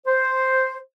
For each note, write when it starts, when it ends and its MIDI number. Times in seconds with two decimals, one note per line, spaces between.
0.06 0.77 72